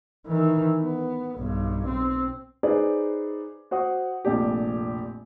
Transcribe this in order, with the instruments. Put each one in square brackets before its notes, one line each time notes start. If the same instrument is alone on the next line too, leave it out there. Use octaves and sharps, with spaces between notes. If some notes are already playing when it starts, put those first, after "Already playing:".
[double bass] D#3 E3
B3
B1 G2
C4
[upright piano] D#4 G#4 B4 C5 D5
F#4 C5 F#5 D#6
F1 A#1 F2 A#2 D4 G4